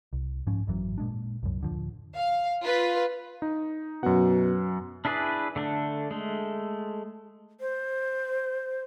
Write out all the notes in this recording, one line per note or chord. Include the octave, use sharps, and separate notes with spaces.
C2
G#2 F3 C#4
G#1 F#2 E3 F#3
A#2 G#3 D4
C2 F#2
D1 D3 F3
F5
F4 B4
D#4
F#2 B2 F#5
D4 E4 G#4 B4 D5
D3 A3 D4
G#3 A3
C5